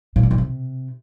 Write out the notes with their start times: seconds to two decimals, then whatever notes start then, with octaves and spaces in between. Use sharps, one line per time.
0.16 A#2
0.23 F#2
0.31 B2
0.38 C3